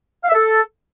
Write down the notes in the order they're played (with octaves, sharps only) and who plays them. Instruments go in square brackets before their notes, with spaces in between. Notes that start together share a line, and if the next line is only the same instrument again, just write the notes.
[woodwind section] F5
E5
A4